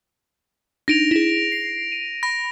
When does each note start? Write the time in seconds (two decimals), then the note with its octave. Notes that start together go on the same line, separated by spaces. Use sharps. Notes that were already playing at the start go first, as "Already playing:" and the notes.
0.88 D4 D#4 A#6 D7 F7
1.11 E4 G#4
1.52 C7
1.92 D#7
2.23 B5 A#6